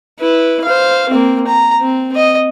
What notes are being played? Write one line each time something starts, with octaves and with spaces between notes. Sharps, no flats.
E4 B4
C5 F5
A#3 C4
A#5
C4
D#5